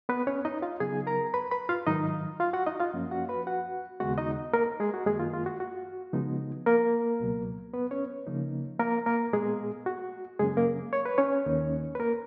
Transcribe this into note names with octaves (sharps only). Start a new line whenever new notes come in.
B3 B4
C#4 C#5
D#4 D#5
F4 F5
C#3 F#3 B3 D#4 G#4 G#5
A#4 A#5
B4 B5
B4 B5
F4 F5
G#2 D#3 F#3 D#4 D#5
F4 F5
F#4 F#5
D#4 D#5
F4 F5
F#2 F3 A#3 C#4
F#4 F#5
B4 B5
F#4 F#5
D#2 C#3 G#3 B3 F#4 F#5
D#4 D#5
A#3 A#4
G#3 G#4
F#4
F#2 D#3 G#3 A#3 G#4
F4
F4
F#4
F#4
C#3 F3 G#3 B3 D#4
A#3 A#4
C#2 B2 F#3
B3 B4
C#4 C#5
C#3 F3 A#3 D#4
A#3 A#4
A#3 A#4
A#2 G#3 B3 G#4
F#4
F#2 C#3 F#3 G#3 A#3 C#4 G#4
A#3 A#4
C#5
B4
C#4 C#5
D#2 D#3 A#3 D#4
B4
A#3 A#4